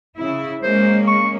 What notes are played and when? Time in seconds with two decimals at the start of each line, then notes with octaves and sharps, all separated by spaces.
0.18 C#3 E4
0.62 G#3 A#3 C#4 C5
1.07 C#6